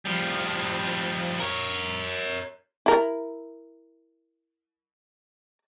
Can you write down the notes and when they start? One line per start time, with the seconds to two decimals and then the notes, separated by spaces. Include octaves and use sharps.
0.05 F3 G3
1.40 A#4 C#5
2.86 E4 A#4